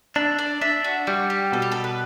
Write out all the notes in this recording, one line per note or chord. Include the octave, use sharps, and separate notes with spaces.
D4 E5
D5
D4 E5
F#4
G3 F#4
G4
B2 A4
G4
A4
B4